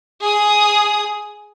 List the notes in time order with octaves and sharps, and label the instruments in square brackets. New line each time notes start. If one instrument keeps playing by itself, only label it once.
[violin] G#4 D#6